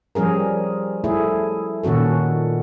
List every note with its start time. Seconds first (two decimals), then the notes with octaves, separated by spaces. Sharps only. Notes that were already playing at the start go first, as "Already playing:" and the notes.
0.15 F3 G3 C#4 G#4 A#4
1.04 A3 E4 G#4
1.83 A#2 D#3 C#4 F#4 A4